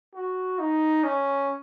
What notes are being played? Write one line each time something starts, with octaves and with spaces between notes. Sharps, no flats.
F#4
D#4
C#4